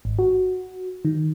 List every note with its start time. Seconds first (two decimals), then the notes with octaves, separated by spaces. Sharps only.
0.05 G#1
0.19 F#4
1.05 D#3